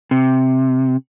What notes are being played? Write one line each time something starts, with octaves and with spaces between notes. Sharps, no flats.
C3